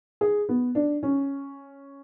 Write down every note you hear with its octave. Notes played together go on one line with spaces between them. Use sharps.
G#4
B3
D4
C#4